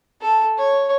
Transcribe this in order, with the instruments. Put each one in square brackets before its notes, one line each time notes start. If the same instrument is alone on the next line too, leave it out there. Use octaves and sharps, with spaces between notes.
[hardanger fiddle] A4
C#5